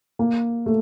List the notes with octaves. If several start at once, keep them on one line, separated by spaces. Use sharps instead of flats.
A#3
A3